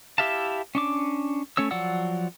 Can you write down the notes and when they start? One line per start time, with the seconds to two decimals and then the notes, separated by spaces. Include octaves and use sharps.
0.18 E4 G4 E5 F5 A5
0.75 C#4 D4 D6
1.57 A3 C#4 C#5 E6
1.71 F3 F#3 D5 F#5 E6